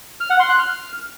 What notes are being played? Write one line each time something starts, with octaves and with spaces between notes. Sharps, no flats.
F6
F#5
C6
F#6
F6